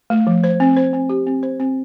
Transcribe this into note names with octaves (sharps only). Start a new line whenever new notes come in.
A3
F3
C5
C4
C5
C4
G4
C4
C5
C4